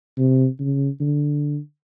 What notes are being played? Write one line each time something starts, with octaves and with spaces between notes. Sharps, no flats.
C3
C#3
D3